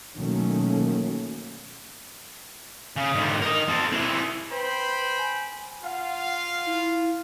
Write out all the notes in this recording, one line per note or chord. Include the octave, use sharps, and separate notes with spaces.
B2 D#3 F#3 A3 A#3 C#4
C#3
G#2 D3
A#4 D#5
C4 A4
C4 E4
B4 C5 G5 B5
G#5
F4 F5 F#5
E4